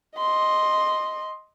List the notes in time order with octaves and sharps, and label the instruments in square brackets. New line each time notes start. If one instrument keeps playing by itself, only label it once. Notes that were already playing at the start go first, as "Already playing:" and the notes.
[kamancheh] D#5 C6